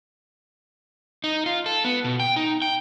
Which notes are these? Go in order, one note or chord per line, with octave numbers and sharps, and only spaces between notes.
D#4
F4
A4
B3
B2
G5
D#4
G5